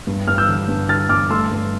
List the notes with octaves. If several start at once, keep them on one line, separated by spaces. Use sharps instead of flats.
G2
G2 F6
E6 G6
D3
G2
D3 F6 A6
G2 D6 F6
A3 C6 E6
G2